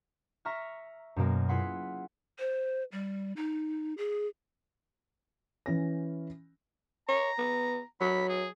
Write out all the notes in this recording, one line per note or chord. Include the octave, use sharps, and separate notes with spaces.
E5 A#5 C#6 F6
F#2 B2 A#3
E4 F4 G#4 F#5 B5 C6
C5
G3
D#4
G#4
E3 C#4 A#6
C#5 A#5
B3
F#3 B5
G#4